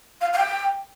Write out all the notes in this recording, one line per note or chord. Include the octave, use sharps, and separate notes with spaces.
F5
F5
G5